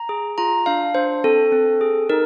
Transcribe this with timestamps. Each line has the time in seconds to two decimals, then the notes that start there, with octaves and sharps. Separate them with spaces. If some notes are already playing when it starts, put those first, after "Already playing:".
Already playing: A#5
0.09 G#4
0.38 F4 A#5
0.66 D4 F5
0.95 D4 C5
1.24 C4 A4
1.52 C4
1.81 G#4
2.09 D#4 A#4